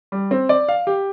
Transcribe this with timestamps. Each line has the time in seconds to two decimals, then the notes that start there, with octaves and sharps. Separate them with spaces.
0.12 G3
0.31 C4
0.49 D5
0.68 F5
0.87 G4